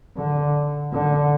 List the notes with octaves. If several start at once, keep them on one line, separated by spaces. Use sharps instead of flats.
D3
D3